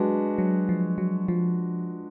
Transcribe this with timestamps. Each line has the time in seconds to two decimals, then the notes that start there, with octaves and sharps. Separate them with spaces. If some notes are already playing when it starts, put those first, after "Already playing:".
Already playing: F#3 G#3 D4 F#4 B4
0.38 F#3
0.69 F3
0.98 F#3
1.28 F3